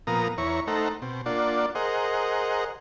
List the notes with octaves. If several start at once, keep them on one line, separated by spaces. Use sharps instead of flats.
A#2 F3 B3 A#4 A#5 D#6
E2 E4 C#5 A#5 C#6
A3 D#4 A4 C5 F#5 A#5
B2 C4
A#3 D4 F4 D5 F#5
G#4 A#4 C5 D#5 F#5